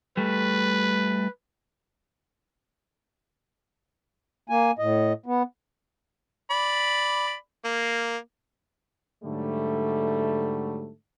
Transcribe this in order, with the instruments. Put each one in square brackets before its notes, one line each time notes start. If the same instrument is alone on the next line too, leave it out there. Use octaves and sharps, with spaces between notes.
[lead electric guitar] G3 A3 [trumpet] B4
[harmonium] A#3 G#5
A2 D#5
B3
[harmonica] D5 B5
A#3
[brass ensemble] G#2 D3 F#3 G3 A3